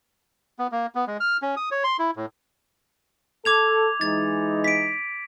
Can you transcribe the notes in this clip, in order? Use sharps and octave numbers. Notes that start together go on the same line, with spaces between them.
B3
A#3
B3
G#3
F6
C#4
D#6
C#5
C6
E4
A2
A4 D6 G#6 F7
E3 G#3 D#4 A6
B6 D7